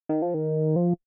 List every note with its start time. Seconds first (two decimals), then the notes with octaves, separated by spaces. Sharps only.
0.09 D#3
0.22 F3
0.34 D#3
0.76 F3